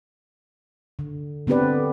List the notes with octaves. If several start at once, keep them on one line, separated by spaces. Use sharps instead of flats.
D3
D3 B3 C4 G4 B4 D5